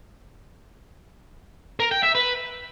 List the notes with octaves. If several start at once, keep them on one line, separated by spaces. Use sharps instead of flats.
A#4
G5
E5
B4